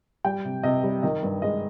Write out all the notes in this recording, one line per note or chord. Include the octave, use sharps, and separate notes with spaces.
G3 G5
C3
C3 D#5
G3
D#3 D#5
G2
G#3 D#5